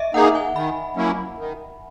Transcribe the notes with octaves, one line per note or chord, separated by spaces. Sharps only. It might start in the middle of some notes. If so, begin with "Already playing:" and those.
Already playing: D#5 E5
A#3 D#4 G#4 F#5
G#5
D#3 B5
F#3 A#3 C#4 E4
D#3